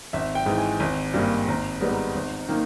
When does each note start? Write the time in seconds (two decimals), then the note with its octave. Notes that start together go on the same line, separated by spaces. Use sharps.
0.13 G#1 E5
0.35 G5
0.46 G#2 E3
0.58 G#5
0.80 G#1
1.14 G2 G3 A#3
1.47 G#1 A#5
1.81 G#2 G3 B3
1.92 A#5
2.15 G#1
2.49 D#3 A#3